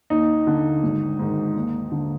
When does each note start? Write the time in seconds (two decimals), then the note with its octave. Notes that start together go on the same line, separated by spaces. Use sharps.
0.10 D#2 D#4
0.47 D3
0.83 G#1
1.19 G#2 D#3
1.55 D#2
1.92 D3